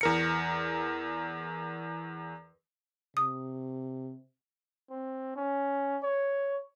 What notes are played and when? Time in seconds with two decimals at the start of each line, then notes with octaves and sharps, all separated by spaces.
0.01 E2 A#4 C#7
3.17 C3 D#6
4.90 C4
5.36 C#4
6.03 C#5